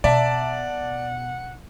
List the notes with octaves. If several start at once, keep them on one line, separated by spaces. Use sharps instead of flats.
B2 D5 E5 F#5 A5 A#5